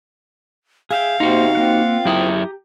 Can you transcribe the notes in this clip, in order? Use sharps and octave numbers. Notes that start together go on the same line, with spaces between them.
G#4 E5 F5 G5
C3 A#3 C4 D#4 F#4 C5
A#3 C4 F4 F#5
F#2 E4 G4 A#5 D#6